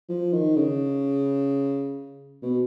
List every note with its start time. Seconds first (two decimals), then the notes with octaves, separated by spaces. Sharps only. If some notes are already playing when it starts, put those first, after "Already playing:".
0.09 F3
0.33 D#3
0.57 C#3
2.42 B2